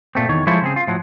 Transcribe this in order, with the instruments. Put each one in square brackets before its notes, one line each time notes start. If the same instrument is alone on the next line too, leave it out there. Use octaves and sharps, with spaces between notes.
[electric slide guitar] A#2 A3 C4
E2 D#3 C#5
F3 G#3 E4 A4 C5 C#5
C#3 C4 G#4
F4
A2 F3 F#3